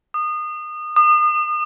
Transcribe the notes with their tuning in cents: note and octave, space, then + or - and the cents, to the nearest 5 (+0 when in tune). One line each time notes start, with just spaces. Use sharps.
D#6 -25
D#6 -35